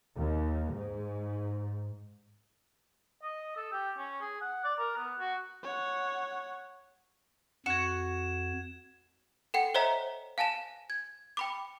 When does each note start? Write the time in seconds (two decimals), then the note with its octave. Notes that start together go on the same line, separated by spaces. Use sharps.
0.15 D#2
0.73 G#2
3.23 D#5
3.57 A4
3.72 G4
3.98 C#4
4.21 G#4
4.41 F#5
4.64 D5
4.79 A#4
4.97 B3
5.20 F#4
5.63 C#5 F#5
7.66 F2 F#4 G#6 E7
9.54 A4 F#5 G5
9.74 C5 C#5 D#5 E5 A#5 B6
10.38 F5 G#5 A5 A#6 E7
10.90 G#6
11.37 G5 B5 D6